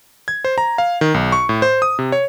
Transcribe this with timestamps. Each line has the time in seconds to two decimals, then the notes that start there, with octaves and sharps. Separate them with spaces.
0.28 G#6
0.45 C5
0.58 A#5
0.78 F5
1.01 D#3
1.14 B1
1.32 C#6
1.49 A2
1.62 C5
1.82 D#6
1.99 C3
2.12 C#5